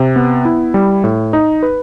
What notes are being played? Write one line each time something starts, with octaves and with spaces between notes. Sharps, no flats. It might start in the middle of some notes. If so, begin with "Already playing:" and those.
Already playing: C3
B3
E4
G3
A2
D#4
B4